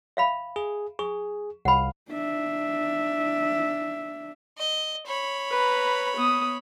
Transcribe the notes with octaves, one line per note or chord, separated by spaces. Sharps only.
E5 F5 B5
G#4
G#4 C#6
C2 F5 F#5 B5
D4 E5
D#5
C#5 B5
B4 A#5
B3 D#6